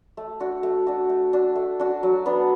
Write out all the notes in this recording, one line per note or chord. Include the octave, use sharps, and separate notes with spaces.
A3
D4 F#4
A3
D4 F#4
A3
D4 F#4
A3
D4 F#4
F#3
B3 D4